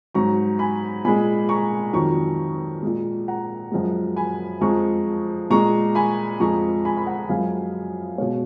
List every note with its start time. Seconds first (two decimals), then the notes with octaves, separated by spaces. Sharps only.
0.15 G#2 F#3 A#5 C#6
0.59 G#5 B5
1.05 A#2 G#3 G#5 B5
1.49 A#5 C#6
1.93 F2 D#3 F#3 A#5 C#6
2.83 A#2 G#3
3.28 F#5 A#5
3.72 F#2 F3 G#3
4.16 G#5 B5
4.61 F2 F3 G#3 A#5 C#6
5.50 A#2 G#3 A#5 C#6
5.95 G#5 B5
6.40 F2 F3 G#3 A#5 C#6
6.85 G#5 B5
6.97 B5
7.07 F#5 A#5
7.29 F#2 F3 G#3 F5 G#5
8.18 B2 G#3 C#5 F5